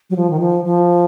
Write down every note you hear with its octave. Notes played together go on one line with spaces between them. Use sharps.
F#3
F3
D#3
F3
F3